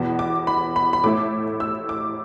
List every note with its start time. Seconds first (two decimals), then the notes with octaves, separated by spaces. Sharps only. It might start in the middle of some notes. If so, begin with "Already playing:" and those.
Already playing: E2 B2 B3
0.19 D6
0.47 B5
0.76 B5
0.93 B5
1.04 A2 A3 E4 D6
1.60 E6
1.89 D6